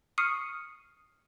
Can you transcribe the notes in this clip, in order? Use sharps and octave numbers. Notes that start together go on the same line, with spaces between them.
C#6 D#6 F6 C7 C#7 D#7